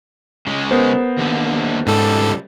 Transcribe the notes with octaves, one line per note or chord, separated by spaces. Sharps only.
C#3 G#3
B3 A#4 C5
D#2 D3
C#2 G#2 G3 A4